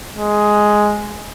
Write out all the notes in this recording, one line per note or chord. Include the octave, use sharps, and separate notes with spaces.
G#3